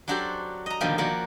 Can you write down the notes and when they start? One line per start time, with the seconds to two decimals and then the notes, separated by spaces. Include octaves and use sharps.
0.08 F#3 D4 F#4 G4 A4 C5
0.66 D#5 A#5
0.81 B2 D3 D#3 F3 G3 A#3
0.98 F3 A#3 F#4 C#5 D5